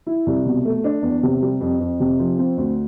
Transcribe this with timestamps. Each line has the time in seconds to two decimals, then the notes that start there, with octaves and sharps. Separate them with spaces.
0.07 E4
0.26 C2
0.46 B2
0.65 A3
0.84 D4
1.02 E2
1.23 C3
1.42 G3
1.61 F2
1.80 F2
2.00 C3
2.19 F3
2.39 C4
2.57 D2